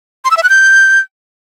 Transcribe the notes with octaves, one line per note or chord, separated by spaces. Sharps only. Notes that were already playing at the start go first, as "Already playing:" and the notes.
C6
E6
E5
F#6
G6